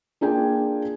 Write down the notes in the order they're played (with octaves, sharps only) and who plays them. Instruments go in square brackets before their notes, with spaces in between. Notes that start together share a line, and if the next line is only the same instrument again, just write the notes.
[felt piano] A#3 D4 F4 G#4 G5 G#5